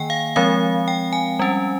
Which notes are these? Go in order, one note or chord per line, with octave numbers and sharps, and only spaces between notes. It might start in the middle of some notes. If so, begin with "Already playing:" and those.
Already playing: D#3 A#3 G5 G#5
F5
F3 G#3 C4 F5
G5
G#5
G3 C#4